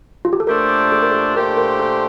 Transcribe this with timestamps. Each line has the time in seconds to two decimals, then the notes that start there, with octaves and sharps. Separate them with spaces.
0.25 F4
0.33 G4
0.40 A4
0.47 A#2 A3 D4 G4 A#4 C5
0.92 A4
1.02 A#4
1.11 A4
1.35 A#2 A3 D4 G4 A#4 C5
1.57 A#4
1.80 A4